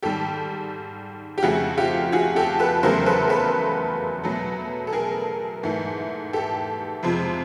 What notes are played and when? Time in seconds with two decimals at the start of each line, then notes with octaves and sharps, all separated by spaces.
0.02 G#2 D#3 G3 G4 A4
1.38 G4
1.43 F2 C#3 F3 A3 F#4 G#4
1.77 F4 G4
2.12 F#4 G#4
2.36 G4 A4
2.59 A4 B4
2.83 E2 C#3 F#3 A3 A#4 C5
3.06 A4 B4
3.29 A4 B4
4.24 B2 F#3 A3
4.87 A4
4.93 G#4 A#4
5.63 G#2 E3 A3
6.33 G4 A4
7.03 F2 C3 F3 G#3